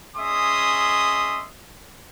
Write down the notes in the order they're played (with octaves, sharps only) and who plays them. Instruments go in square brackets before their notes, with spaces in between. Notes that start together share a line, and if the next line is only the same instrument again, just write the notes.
[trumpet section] C#4 G#4 D#5 E5 C6 D#6